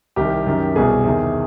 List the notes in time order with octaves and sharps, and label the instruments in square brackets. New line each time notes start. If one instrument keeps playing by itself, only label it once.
[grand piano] C2 C3 D#3 G4
F#2 D#3
C2 B2 G#4
E2 C3 D#3